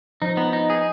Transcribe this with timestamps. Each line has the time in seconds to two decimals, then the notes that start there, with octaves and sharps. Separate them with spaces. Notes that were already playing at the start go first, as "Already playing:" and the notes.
0.22 F3 D#4
0.37 B3
0.53 D#4
0.70 G#4